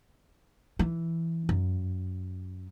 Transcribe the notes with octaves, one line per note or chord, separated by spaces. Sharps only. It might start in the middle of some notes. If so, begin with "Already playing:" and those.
E3
F#2